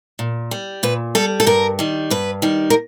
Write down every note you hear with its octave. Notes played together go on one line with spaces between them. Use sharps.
A#2
G3
A#2 B4
G3 A4
A4
G2 A#4
D#3 G3
G2 B4
D#3 G3
A#4